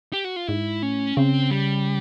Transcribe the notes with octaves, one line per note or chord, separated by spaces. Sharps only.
G4
F#4
F4
G#2 E4
A2 C#4
C#3 C4
G3